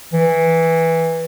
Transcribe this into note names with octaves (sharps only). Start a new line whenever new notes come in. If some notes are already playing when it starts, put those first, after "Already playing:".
E3